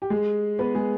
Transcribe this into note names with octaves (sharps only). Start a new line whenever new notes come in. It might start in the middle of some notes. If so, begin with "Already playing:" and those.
G4
G#3 G#4
B3 B4
G#3 G#4